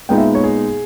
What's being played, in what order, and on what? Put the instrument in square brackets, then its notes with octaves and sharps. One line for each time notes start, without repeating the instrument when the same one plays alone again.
[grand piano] A#2 G#3 B3 D#4 G5
E5
C#5
G#4